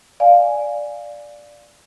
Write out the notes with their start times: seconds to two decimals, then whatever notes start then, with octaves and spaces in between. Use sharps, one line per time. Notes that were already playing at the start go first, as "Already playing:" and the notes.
0.20 D5 F5 G#5